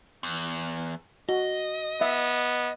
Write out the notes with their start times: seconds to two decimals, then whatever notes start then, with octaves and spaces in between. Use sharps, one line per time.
0.23 E2
1.29 F#4 D#5
2.01 B3 E5